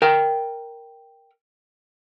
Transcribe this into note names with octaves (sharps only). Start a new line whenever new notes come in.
A#4 G5